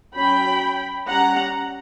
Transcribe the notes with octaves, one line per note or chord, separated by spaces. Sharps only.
F#3 C#4 G5 B5
G3 C#4 F#5 A#5